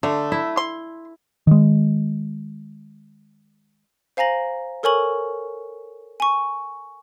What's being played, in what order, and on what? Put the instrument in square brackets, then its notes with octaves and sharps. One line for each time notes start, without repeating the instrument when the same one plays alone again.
[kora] D3 [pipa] A3
[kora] E4
[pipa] C6
[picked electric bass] D#3 G#3
[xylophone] C5 F5 G#5 A#5 A#6 F#7
A4 A#4 C#5 G#5 C#6 F#7
G#5 C#6